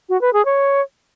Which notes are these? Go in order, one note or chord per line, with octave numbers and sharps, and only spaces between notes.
F#4
B4
G#4
C#5